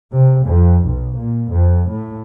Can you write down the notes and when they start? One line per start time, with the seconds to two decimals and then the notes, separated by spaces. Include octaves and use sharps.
0.11 C3
0.45 F2
0.84 B1
1.15 A#2
1.51 F2
1.87 A2